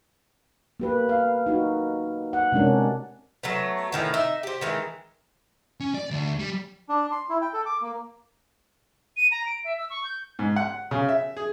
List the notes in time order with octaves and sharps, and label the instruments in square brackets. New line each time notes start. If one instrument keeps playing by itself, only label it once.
[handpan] A#3 G4 B4
F5
D#4 F#4
F#5
C3 G#3 C#4 D4 A#4
[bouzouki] F#3 A3 B3
A2 D#3 E3
D#4 E5
G4 C5
D#3 E3 G#3
[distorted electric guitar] C#4
D5
D2
G3
[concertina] D4
C6
E4
G5
A4
D6
A#3
[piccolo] D#7
A#5
D7
E5
E6
C#6
G6
[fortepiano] G#2
F#5
C#3
E5
G#4